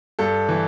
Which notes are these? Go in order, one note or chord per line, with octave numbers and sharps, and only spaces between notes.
G2 A4
E3